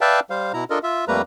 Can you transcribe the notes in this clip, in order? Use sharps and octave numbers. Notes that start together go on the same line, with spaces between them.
B4 D5 E5 F5 G5 A5
G3 C5 F5
B2 E4 A#5
D4 F4 A4 A#4 D#5
F4 E5
F2 G3 A3 A#3 B4 A#5